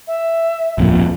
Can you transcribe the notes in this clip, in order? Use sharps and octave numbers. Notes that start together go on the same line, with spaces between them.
E5
D1 F2 A#2